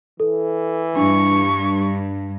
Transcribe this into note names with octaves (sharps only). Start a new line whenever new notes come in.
E3 A4
G2 D4 C#6